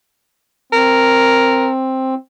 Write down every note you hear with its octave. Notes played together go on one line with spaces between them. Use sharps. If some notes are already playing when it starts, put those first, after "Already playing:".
C4 A#4